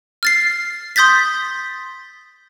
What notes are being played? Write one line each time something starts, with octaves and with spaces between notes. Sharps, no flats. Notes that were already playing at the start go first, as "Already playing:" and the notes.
F6 A6 C7
C6 D#6 G6 A6 B6